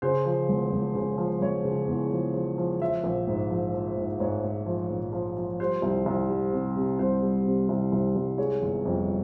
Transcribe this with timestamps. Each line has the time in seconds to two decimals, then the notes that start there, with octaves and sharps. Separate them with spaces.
0.02 C#3 C5
0.25 F3
0.49 E1
0.72 E1
0.95 C#3
1.18 F3
1.41 E1 C#5
1.64 C#3
1.88 E2
2.12 F3
2.34 F3
2.58 F3
2.80 F3 E5
3.04 A#1
3.27 G#2
3.50 F3
3.74 F3
3.97 G#2
4.20 G#2 C#5
4.44 G#2
4.66 F3
4.91 A#1
5.13 F3
5.37 F3
5.60 G3 C5
5.82 C2
6.06 C2
6.29 G3
6.53 C3
6.76 C3
6.99 C2 C5
7.22 G3
7.46 C3
7.69 C2
7.92 C2
8.16 C2
8.38 G#3 C#5
8.62 G1
8.85 F2